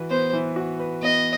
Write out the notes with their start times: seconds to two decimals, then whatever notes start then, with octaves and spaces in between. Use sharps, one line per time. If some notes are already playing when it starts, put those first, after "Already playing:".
Already playing: E3 F#4 B4
0.10 B3 C5
0.33 E3
0.56 F#4
0.79 B4
1.02 B3 D#5